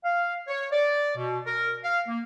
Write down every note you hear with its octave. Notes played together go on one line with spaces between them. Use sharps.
F5
C#5
D5
B2
A#4
F5
A#3